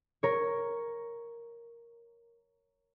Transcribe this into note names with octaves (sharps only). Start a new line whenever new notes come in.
A#4 C#5